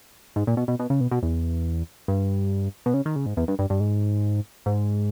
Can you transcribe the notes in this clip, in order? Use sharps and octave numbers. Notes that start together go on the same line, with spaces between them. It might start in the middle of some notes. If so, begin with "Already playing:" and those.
G#2
A#2
B2
B2
B2
C#3
B2
B2
E2
G2
B2
C#3
D#3
C#3
G#2
E2
G2
G2
G2
G#2
G#2